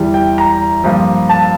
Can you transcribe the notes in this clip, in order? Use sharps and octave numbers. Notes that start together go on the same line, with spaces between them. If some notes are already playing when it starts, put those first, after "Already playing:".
Already playing: E2 E3 G3
G5
A#5
G2 F3 A#3
A5